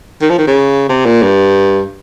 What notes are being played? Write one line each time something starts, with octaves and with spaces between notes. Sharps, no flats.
D#3
F3
D#3
C#3
C3
A#2
G2